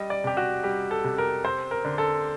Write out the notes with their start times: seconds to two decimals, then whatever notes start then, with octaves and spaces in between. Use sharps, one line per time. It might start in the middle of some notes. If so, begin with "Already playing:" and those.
Already playing: G3 D#5
0.10 D5
0.24 C3 G4
0.37 F#4
0.64 G3 G4
0.91 A4
1.04 C3
1.18 A#4
1.44 C4 C5
1.71 A#4
1.85 D3
1.98 A4